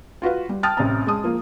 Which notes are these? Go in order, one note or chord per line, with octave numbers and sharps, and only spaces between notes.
F4 F#4 B4 F5
G3
G5 A5 D#6 F6 A6
A1 C3 A#5
G#3 A5 D#6
F3 A#3